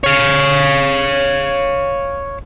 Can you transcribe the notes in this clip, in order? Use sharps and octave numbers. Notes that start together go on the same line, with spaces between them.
C#5 F5